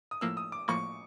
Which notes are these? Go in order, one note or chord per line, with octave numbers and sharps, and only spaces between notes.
D#6
A2 F3 A#3 E6
D#6
D6
A2 F3 A#3 C#6